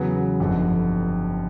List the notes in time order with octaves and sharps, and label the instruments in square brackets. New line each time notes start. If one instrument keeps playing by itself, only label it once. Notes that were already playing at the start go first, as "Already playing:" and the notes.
Already playing: [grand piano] E2 C#3 F#3 B3
G1 F2 D3